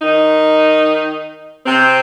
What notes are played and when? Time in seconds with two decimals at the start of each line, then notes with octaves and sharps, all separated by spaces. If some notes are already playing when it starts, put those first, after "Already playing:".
0.01 D#3 D#4
1.66 C3 C4